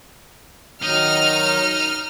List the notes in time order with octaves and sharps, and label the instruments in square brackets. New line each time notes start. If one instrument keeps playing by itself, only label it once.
[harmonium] D#3 F#3 [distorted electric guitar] D#4 D#5 [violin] F6